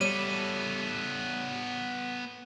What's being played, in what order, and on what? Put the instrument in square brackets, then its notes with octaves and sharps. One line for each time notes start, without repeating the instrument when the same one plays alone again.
[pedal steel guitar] G3 [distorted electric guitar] B3 A4 [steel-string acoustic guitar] C#5 E5 [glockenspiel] D#7